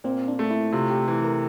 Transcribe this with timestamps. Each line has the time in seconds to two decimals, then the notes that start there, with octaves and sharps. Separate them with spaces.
0.04 A#2 C4
0.28 D4
0.39 A3
0.50 E4
0.72 C3 F4
0.90 G4
1.07 E3 A4
1.24 A#4